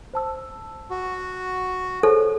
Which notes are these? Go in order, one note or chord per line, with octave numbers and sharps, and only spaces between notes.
C5 A5 E6
F#4
G#4 A4 C5 C#5